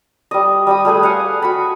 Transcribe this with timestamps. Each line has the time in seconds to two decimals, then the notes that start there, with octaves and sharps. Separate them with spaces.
0.31 G3 D#5
0.67 G3 B5 D#6
0.85 G3 A3 G#4 B4
1.03 F5 F#5 G#5
1.42 F#4 B5